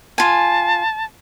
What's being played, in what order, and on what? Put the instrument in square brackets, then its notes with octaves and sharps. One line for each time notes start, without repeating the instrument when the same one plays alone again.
[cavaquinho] F4 G#5 [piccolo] A5